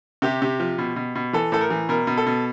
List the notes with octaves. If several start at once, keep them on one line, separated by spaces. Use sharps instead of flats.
C3 G4
C3
F3
B2
B2
B2
E3 A4
A2 A4
A#4
E3
B2 A#4
B2
A4
B2